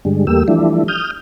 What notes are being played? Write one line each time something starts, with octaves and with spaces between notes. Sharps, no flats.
G2 D3 G3 G#3
E2 G3 A3 A#3 G4 E6
E3 F3 G3 A3 D4 E4
D#6 F6 G6